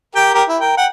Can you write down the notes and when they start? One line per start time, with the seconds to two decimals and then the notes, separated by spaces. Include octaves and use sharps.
0.15 G4 A#4 G5
0.34 G4 A#4
0.48 E4
0.60 A#4 G5
0.77 F#5 G5